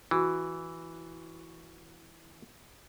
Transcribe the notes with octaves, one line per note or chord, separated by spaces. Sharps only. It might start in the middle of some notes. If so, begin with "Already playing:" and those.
E3 F#4